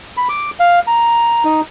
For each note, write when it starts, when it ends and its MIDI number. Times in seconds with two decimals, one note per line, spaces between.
0.17 0.28 83
0.29 0.51 86
0.60 0.79 77
0.87 1.44 82
1.45 1.61 63